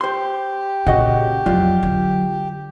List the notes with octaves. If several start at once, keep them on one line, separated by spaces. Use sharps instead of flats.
G4 C5 C6
A#2 C#3 F#4 D#5 F#5
F2 F#3 F4 D5
D3